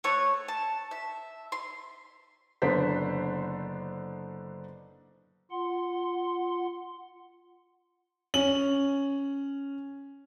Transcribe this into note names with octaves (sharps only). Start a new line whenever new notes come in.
A3 C#5 C#6 F#6
A5
E5
C6
F#1 D3 B3 D4 C5 B6
F4 F#5 C6
C#4 F#7